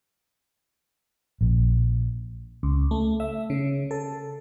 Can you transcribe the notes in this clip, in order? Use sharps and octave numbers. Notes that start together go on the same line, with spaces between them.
A#1
C#2
A3
E5
C#3
A4